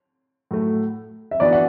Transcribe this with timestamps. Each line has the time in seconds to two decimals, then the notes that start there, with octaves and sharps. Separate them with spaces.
0.51 A2 F#3 A3
1.31 E5
1.40 E3 B3 D4 F#4 D5
1.53 F#5